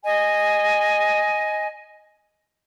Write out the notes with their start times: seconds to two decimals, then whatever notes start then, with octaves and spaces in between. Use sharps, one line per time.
0.04 D#5 G#5